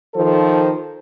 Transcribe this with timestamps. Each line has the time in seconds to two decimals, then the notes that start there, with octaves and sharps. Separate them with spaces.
0.14 D#3 F3 A4 C5